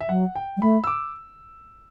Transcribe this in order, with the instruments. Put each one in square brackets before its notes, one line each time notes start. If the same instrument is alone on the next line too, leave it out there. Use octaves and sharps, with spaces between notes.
[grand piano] E5
[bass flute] F#3 [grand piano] F#5
[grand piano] G5
[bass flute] G3
[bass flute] A3 [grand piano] B5
[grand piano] E6
D6